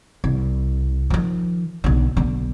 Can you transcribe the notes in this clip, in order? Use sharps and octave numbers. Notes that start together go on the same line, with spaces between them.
C2
D#3 F3
B1 D3
B1 D3